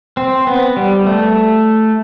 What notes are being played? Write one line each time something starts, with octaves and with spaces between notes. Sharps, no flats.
C4
B3
G3
A3